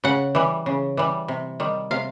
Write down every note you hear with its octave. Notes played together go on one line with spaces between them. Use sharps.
C#3 F#5
E3 G3
C#3
E3 G3
C3
D#3 G3
C3 F5